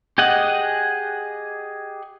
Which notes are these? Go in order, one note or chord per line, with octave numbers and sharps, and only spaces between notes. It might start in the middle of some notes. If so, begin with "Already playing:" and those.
G4 G#4 D#5 F#5